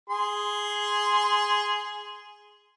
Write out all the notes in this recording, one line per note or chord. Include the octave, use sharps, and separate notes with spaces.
G#4 C6